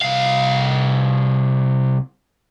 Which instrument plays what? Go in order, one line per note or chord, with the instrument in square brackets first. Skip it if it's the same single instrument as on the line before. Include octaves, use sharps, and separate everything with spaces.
[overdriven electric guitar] C2 F5